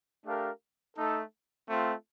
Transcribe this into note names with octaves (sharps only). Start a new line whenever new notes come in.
A3 D4 G4 A#4 F5
A3 D#4 A4
A3 C4 F4